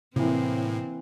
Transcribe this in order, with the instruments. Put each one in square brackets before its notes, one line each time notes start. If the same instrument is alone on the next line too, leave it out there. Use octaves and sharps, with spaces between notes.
[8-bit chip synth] A2 [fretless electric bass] C3 [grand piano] E3 A#3 [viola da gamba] C4